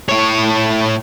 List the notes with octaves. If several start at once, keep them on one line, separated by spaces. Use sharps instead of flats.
A2 C#5